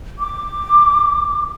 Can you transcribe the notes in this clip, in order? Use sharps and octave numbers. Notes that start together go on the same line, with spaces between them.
D6